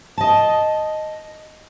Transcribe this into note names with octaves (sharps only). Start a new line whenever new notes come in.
D#5 A5